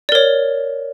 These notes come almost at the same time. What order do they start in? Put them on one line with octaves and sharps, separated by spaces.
D5 A#4 C#5